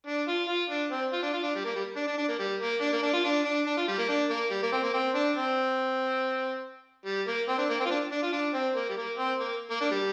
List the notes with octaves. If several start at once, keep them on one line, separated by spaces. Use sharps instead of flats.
D4
F4
F4
D4
C4
F4
D4
F4
D4
G3
A#3
G3
D4
D4
D4
A#3
G3
A#3
D4
A#3
D4
F4
D4
D4
D4
F4
G3
A#3
D4
A#3
G3
A#3
C4
A#3
C4
D4
C4
G3
A#3
C4
D4
A#3
C4
F4
D4
D4
F4
D4
C4
A#3
G3
A#3
C4
A#3
A#3
D4
G3